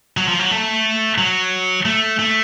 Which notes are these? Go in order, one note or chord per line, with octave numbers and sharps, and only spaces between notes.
F#3
F3
F#3
A3
F#3
A3
A3